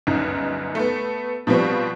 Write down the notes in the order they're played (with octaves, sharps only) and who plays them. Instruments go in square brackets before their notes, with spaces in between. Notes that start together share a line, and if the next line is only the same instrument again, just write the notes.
[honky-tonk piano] G1 C#2 F#2 C#3 D#4
A3 B3
B2 F3 G3 B3 C4